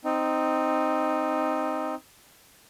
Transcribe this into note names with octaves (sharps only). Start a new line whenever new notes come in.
C4 D#4